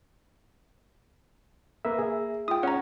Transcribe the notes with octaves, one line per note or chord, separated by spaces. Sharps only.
A#3 B4 E5
G#4 E5
F4 G5 D#6
C#4 F#5 A#5